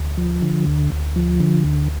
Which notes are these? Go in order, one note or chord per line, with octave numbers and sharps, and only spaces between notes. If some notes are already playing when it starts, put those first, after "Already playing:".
Already playing: D2
F3
D3
D2
D2
F3
D3
D2